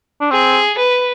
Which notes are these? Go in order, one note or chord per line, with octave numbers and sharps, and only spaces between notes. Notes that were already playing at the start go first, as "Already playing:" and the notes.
D4
C4 G#4
B4